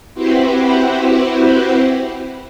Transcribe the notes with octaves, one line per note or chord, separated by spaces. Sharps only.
C4 E4 F#4 G4 B4 C5